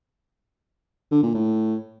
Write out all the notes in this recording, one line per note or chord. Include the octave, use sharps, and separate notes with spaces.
D3
A#2
A2